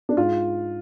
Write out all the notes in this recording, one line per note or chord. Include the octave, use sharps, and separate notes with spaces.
D4
G#2 F4